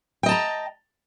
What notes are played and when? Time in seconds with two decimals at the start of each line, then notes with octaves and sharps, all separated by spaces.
0.23 G5
0.26 D#5
0.29 A5
0.31 A#5